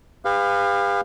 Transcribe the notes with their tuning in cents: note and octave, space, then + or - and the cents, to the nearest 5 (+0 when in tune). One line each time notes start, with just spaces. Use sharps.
G4 +45 B4 +20 F5 +0